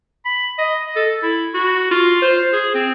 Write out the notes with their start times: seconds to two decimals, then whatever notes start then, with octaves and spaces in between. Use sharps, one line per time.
0.26 B5
0.58 D#5
0.96 A4
1.23 E4
1.54 F#4
1.91 F4
2.22 C5
2.53 G#4
2.74 C4